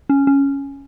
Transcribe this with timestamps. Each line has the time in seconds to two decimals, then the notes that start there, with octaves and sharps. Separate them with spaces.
0.09 C#4
0.27 C#4